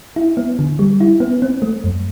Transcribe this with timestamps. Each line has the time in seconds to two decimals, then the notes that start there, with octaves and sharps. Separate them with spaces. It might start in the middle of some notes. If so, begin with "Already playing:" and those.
0.16 E4
0.37 B3
0.59 D3
0.79 G3
1.00 E4
1.20 B3
1.42 C4
1.62 A3
1.84 F#2